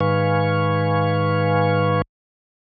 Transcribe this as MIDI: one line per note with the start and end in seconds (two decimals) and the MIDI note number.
0.01 2.02 44
0.01 2.02 51
0.01 2.02 71
0.01 2.02 77
0.01 2.02 80
0.01 2.02 85